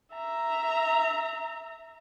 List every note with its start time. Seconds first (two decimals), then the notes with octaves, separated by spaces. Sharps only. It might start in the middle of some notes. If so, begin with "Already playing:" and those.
0.13 E5 A#5